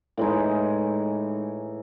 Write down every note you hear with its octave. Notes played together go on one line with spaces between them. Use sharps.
A2 E3 G#3 D#4